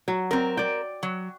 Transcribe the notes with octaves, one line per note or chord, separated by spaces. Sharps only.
F#3
C4 A#4
D5 G5
F#3